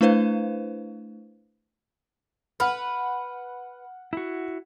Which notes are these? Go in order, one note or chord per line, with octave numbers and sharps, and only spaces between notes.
A3 D4 E4 B4 C5 F5
B4 F#5 F6
E4 F#4